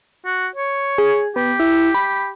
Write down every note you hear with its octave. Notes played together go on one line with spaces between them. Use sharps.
F#4
C#5
G#4
B3 G4
E4
B5